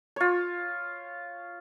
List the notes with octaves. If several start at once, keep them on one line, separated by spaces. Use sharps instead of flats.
F4 C#5